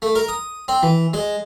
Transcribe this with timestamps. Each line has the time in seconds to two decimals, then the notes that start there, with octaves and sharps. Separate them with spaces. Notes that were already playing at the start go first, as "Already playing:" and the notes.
0.02 A3
0.15 A#4
0.29 D#6
0.68 C4
0.83 E3
1.14 G#3